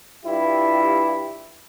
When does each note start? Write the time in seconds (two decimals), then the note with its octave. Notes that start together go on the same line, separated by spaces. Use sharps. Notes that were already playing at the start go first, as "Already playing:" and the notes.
0.24 G2 E4 F4 G4